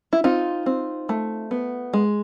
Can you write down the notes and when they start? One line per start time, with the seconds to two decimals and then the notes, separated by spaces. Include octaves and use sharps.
0.13 E4
0.24 C4 D#4 F4
0.66 C4
1.09 A3
1.51 B3
1.93 G#3